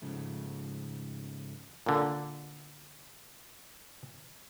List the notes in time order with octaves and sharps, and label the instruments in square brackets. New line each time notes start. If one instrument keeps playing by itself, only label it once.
[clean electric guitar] G#2 C#3 F3 A3
[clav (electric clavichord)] A#2 D3